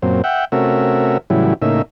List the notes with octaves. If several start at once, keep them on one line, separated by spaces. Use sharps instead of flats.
F#2 A#2 C4
E5 F#5 G5
C3 A3 C#4 F#4 A#4 E5
A2 C#3 E3 F#3 G3 E4
A2 C#3 A#3 D#4 E5